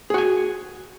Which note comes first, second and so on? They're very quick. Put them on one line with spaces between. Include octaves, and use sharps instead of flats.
G#4 F#4 G#5